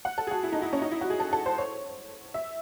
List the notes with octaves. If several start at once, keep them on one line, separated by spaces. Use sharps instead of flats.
F#5
A4
G#4
F#4
E4
D#4
E4
C#4
D#4
E4
F#4
G#4
A4
A4
C5
C#5
E5